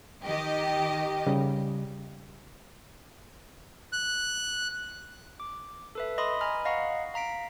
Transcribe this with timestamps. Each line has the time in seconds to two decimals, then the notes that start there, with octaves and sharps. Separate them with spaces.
0.24 D#3 G4 D#5
1.27 C#3 G3
3.93 F#6
5.40 D6
5.95 A4 B4 E5
6.18 D#5 B5 C6 D#6
6.41 D#5 G#5 A#5 B5 F6
6.65 D#5 F5 F#5 A#5 C#6
7.14 F5 A#5 B6 D7